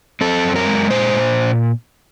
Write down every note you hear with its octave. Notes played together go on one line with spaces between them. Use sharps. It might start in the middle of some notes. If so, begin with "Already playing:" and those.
C4 A4
F#2
A#4
G#3
A#2 C5
A#2